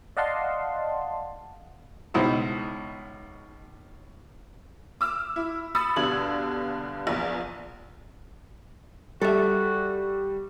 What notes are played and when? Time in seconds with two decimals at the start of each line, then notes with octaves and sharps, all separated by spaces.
0.17 D5 D#5 F5 F#5 A5 C6
2.14 C#2 B2 D#4 E4 C5
5.01 D6 E6 F6
5.36 E4
5.75 B5 D#6 E6 A6 C#7
5.96 G2 B2 D3 G#6 F#7
7.07 A#1 E2
9.22 G3 F#4 A4 E5